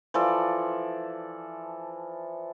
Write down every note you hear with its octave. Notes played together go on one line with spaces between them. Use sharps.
E3 F3 A4 D5